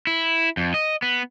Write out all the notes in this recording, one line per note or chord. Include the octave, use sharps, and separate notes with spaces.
E4
F2
D#5
B3